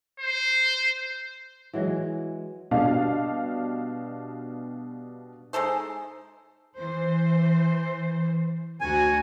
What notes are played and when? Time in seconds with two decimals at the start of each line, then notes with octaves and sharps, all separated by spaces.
0.20 C5
1.73 E3 F#3 G#3
2.71 B2 G3 D4 D#5 F5
5.53 G#3 D#4 A4 C5
6.78 E3 C5
8.81 D2 F#4 G#5